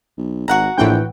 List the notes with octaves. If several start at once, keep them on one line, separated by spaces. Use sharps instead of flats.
B1
G#1 F#4 F#5 A#5
A#1 A2 E3 G5